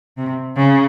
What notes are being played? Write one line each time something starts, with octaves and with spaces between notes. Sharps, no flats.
C3
C#3